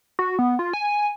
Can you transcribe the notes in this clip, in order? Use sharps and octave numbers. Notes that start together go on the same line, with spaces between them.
F#4
B3
F4
G#5